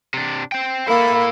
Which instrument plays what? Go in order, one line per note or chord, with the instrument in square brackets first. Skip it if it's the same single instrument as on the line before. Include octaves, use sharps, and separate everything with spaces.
[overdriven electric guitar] C3 D4
C5 G5
[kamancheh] A#3 [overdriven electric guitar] E4 A4 [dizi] B5